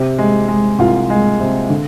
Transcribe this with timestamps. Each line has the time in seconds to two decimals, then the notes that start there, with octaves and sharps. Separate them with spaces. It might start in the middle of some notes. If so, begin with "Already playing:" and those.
Already playing: C3 G4
0.18 G#3
0.48 G#3
0.79 C2 F4
1.10 G#3
1.40 C3
1.70 D3